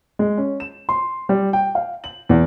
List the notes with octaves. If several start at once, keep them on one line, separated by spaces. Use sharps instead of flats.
G#3
C#4
E7
C6
G3
G5
F5
F#7
E2